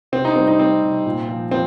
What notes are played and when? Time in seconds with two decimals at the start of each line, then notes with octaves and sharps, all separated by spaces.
0.12 C3 C4
0.25 D#4
0.36 G3 C4
0.48 D#4
0.59 G3 C4
0.82 C3
1.06 A#2
1.29 F3
1.51 F3 C4